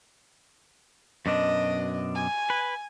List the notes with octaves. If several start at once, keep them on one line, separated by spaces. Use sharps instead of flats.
F#2 B2 D4 D#5
G#5
B4